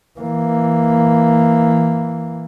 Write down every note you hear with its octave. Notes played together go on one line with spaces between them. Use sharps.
E3 A#3